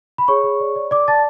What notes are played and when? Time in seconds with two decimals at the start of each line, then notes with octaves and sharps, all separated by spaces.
0.18 B5
0.28 G#4 C#5 C#6
0.44 G#4
0.60 D5
0.76 D5
0.91 D5 D6
1.08 D5 A5 A6